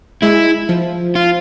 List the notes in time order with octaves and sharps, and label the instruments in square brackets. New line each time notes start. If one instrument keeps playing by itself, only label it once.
[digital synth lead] G#3 [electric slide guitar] E4
[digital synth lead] F3
[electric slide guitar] F4